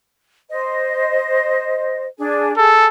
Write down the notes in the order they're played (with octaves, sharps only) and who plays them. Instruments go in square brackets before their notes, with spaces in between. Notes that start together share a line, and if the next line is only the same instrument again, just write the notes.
[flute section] C5 D#5
D4 G#4
[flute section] G#4 [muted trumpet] A4